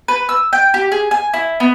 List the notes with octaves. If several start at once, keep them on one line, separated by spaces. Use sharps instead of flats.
B4
E6
G5
G4
G#4
G#5
E4
B3